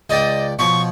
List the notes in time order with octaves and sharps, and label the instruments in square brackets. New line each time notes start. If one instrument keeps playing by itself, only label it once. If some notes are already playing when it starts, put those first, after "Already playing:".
[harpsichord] C#2 D5 G5 [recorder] D#5
[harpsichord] B2 F3 C#5 [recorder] C#6